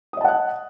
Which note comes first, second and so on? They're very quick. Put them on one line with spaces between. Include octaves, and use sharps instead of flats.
D#6 D#5 A5 F#5 F#6